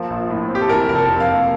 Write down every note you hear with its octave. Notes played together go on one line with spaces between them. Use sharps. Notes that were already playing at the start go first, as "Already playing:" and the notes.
Already playing: F3 A#3
A#1
A2
C4
G4
A4
E3 A#4
F1 A#4
A4
F2
F5
A#3